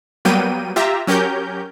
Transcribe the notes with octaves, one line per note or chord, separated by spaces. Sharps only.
F#3 G3 A#3 B3 G5 D#7
F4 G4 E5 A#5
F#3 C#4 G4 A#4 G6